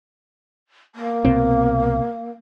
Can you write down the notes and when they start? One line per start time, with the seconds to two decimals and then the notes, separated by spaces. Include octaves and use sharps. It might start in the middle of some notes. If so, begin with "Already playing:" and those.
0.95 A#3
1.25 C2 B2 C4